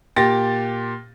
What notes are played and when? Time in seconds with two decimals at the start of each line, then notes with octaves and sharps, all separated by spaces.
0.16 A#2 G4 A6 A#6